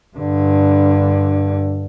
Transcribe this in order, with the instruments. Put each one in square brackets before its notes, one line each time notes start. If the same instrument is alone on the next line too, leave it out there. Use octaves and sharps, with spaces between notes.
[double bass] G2 D3